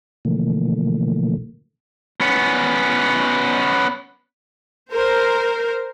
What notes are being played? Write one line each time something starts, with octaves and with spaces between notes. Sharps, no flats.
B2 D3 E3 F3 A3 A#3
B3 C#4
A#4 C5